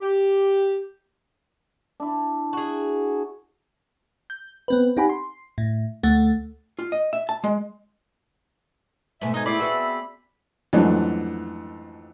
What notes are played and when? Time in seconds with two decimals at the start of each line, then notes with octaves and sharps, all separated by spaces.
0.01 G4
2.00 D4 E4
2.53 F#4 G#4
4.30 G6
4.68 B3 C4 B4
4.97 C4 D#4 G4 F#5 G#5 B5
5.09 C6
5.58 A2
6.03 D2 A3 F#5 A6
6.79 F4
6.92 D#5
7.13 E5
7.29 A5
7.44 G#3
9.21 G#2 B2 A3 E5
9.34 D#4 D#5 G#5
9.46 C4 E4 G#4 D5 B5
9.60 B3 F#4 E5
10.73 F2 G#2 E3 F#3 A3 D4